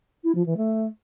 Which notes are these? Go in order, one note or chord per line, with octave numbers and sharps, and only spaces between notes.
E4
F3
E3
A3